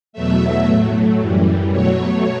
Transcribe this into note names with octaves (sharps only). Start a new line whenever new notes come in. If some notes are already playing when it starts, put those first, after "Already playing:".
E2 B2 F#3 A3 E5
A2 F#3 A3
F#2 E3 G3
B2 F#3 A3 C#5